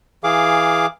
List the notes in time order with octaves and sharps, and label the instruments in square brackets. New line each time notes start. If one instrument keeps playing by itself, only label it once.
[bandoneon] E3 G#4 F5 D6